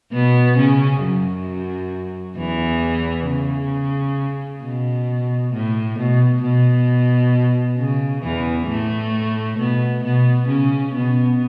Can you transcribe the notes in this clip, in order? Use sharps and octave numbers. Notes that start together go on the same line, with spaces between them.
B2 B3
C#3 C#4
F#2 F#3
E2 E3
C#3
B2
A2
B2
B2
C#3
E2 E3
A2 A3
B2 B3
B2 B3
C#3 C#4
B2 B3